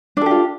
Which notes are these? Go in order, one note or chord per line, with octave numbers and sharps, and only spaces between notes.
D4 F4 G4 A4